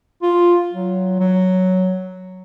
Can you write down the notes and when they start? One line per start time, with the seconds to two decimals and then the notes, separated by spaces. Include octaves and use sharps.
0.22 F4
0.72 F#3
1.19 F#3